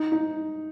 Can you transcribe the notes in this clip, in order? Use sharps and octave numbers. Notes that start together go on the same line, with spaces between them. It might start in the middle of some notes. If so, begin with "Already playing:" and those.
Already playing: D#4
D#4